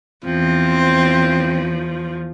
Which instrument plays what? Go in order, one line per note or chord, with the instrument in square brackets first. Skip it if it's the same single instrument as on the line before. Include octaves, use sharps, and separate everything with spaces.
[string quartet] E2 F3 [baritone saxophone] C4